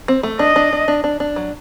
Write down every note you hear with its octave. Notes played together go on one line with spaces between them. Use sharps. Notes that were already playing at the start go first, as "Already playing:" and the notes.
C4
A3
D4 D#5
D4
D4
D4
D4
D4
F#3